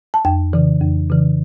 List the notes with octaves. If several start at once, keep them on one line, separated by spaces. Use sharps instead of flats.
A5
F2 G5
C#3 E3
F2
C#3 E3